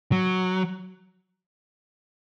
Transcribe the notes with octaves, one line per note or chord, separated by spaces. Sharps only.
F#3